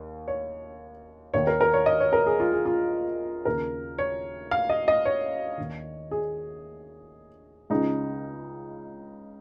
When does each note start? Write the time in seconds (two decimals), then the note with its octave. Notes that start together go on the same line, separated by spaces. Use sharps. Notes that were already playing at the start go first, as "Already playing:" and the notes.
Already playing: D#2
0.28 C#5
1.34 D#2 D#3 C#5
1.47 A#4
1.61 A#4
1.74 C#5
1.86 D#5
2.00 C#5
2.13 A#4
2.26 G#4
2.40 F4
2.53 G#4
2.66 F4
3.45 D#2 C#3 A#4
3.98 C#5
4.51 F5
4.70 D#5
4.88 D#5
5.05 C#5
5.58 D#2 D#3
6.11 G#4
7.70 C#2 C#3 D#4